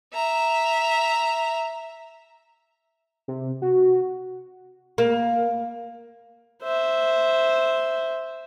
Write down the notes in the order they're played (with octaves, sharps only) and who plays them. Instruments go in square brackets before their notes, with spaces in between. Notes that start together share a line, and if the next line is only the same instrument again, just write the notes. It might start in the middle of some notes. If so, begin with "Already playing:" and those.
[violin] E5 A#5
[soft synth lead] C3
F#4
[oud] A#3
[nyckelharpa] C5 E5